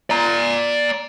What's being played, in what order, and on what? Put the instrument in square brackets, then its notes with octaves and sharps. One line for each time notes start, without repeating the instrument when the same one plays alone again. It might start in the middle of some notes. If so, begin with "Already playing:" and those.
[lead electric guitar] D5 A#5